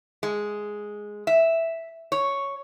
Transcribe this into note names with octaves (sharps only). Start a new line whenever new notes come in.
G#3
E5
C#5